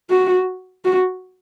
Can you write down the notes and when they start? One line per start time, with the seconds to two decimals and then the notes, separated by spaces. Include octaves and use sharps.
0.10 F#4
0.85 F#4